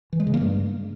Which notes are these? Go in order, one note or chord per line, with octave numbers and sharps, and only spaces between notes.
E3
G#3
C#3
A#3
G2